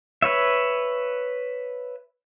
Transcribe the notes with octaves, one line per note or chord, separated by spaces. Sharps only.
B4 C#5 E5